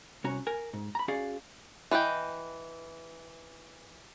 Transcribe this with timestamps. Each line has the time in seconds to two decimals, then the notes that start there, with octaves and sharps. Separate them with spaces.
0.24 C2 C#4 F#4 C#5 A#5
0.47 A#4 G#5
0.73 G#2
0.95 A#5 B5
1.08 C#4 F#4 G#4 D5 F5
1.91 E3 B4 D#5 G5